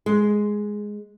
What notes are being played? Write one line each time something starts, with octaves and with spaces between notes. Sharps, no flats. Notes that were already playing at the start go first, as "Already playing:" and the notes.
G#3